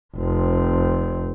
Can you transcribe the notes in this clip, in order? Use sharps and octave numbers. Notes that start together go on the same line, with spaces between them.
F1 C4